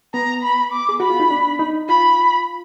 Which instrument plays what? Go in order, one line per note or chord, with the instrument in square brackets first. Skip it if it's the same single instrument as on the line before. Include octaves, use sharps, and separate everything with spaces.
[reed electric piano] B3 [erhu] A#5
[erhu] B5
D6
[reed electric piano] G#4
[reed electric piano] F#4 [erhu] B5
[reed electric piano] F4
D#4
D4
D#4
[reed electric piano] F4 [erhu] B5